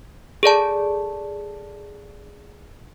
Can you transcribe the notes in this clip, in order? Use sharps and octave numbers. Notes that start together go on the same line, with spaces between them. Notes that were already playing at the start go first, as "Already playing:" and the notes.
G#4 A4 D5 A5